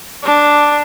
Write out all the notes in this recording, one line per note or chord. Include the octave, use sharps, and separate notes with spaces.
D4